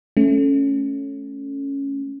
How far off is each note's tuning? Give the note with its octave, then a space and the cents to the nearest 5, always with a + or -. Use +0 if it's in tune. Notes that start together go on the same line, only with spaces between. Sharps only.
A3 -10 C#4 +0